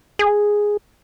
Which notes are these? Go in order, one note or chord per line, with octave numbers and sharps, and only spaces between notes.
G#4